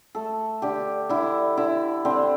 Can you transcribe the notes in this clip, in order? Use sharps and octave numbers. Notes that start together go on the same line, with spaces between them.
A3 A4
D3 G4
D3 E4
D3 E4
D3 C4